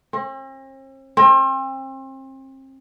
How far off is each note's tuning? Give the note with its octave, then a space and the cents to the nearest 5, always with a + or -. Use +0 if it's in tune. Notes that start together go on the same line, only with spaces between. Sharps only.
C4 +45
C4 +35